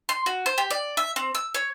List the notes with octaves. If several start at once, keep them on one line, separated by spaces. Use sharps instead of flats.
C6
F#4
C5
G4
D5
E5
C4
E6
C#5